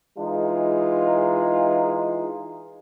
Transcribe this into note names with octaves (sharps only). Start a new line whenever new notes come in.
E3 G#3 D#4 F4